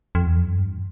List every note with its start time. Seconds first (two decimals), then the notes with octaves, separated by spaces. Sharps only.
0.15 F2
0.26 E2
0.37 F2
0.47 F#2
0.58 G2